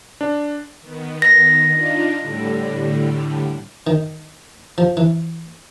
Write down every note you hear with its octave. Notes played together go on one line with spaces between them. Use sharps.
D4
D#3 B3
A#6
D4 D#4 F4
A2 D3 G3
D#3
F3
E3